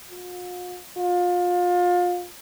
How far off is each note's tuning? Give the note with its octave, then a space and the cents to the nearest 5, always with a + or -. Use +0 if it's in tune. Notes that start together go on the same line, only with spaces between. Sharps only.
F4 +45
F4 +30